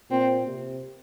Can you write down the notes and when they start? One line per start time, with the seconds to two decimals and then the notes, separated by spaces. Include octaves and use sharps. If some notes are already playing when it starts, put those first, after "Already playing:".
0.11 A#2 C4
0.48 C3